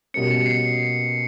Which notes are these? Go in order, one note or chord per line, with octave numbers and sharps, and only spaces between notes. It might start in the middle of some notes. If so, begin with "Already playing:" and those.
B2 G3 A#3 C#4 C#7
C#7
C7